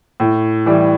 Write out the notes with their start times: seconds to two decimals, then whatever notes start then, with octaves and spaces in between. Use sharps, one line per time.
0.20 A2
0.66 E3 G3